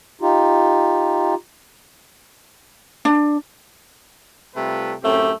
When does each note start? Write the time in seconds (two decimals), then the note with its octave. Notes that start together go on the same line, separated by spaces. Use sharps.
0.21 D#4 F4 G4
3.05 D4
4.56 C3 G3 A3 F4 A4 B4
5.03 F#2 A2 A3 C4 G4